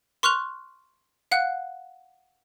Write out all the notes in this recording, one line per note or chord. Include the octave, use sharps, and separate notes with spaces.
C6 C#6 F6 F#6 F7
F5 F#5 F#6